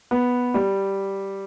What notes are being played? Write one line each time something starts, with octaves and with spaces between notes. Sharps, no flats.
B3
G3